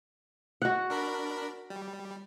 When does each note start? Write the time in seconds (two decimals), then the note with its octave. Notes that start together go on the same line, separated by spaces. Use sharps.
0.62 F#4 F#5
0.90 D4 A#4 B5
1.70 G3